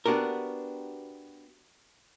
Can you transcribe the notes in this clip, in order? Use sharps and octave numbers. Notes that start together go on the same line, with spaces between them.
B3 D4 F#4 G4 A#4